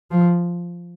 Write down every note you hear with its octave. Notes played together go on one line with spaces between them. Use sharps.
F3